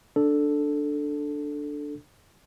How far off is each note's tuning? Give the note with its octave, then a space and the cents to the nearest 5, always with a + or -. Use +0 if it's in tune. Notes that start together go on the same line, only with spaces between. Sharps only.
D4 +0 A4 +0